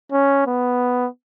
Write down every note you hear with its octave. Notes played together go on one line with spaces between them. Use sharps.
C#4
B3